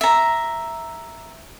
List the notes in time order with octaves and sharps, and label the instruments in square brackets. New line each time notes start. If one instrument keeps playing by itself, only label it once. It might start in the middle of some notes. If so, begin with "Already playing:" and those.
[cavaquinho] E5 A#5